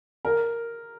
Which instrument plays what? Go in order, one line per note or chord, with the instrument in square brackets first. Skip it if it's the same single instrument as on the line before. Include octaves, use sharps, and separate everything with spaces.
[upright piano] A#4